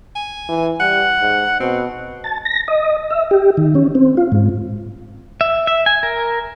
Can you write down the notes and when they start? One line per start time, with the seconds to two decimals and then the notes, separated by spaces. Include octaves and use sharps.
0.16 G#5
0.49 E3
0.80 G3 F#5
1.21 G#2
1.60 B2 C4
2.24 A5
2.45 A#6
2.68 D#5
3.11 E5
3.31 G4
3.57 D#3
3.75 C#4
3.95 C4
4.17 F4
4.32 G#2
5.41 E5
5.67 E5
5.86 G#5
6.03 A#4